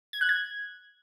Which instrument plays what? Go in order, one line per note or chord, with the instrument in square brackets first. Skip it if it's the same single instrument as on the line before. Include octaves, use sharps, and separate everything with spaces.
[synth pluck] G#6
F#6
G#6